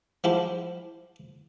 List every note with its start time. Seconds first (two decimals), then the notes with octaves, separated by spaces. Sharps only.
0.24 F3 E4 G4